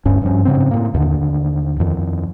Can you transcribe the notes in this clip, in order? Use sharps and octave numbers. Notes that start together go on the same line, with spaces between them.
D1 G2 C#4
G2 F3 C#4
G#2 C#3 B3 C4
A2 A#3
D#2 D3
F2 D#3